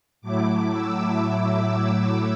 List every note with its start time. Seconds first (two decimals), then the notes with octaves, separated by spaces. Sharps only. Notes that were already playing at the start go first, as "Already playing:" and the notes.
0.21 A2 F#3 A3 E4 D6
0.72 E6
1.22 D6